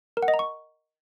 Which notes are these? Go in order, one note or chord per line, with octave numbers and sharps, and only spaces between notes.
A#4
F#5
D#5
A#5
C#6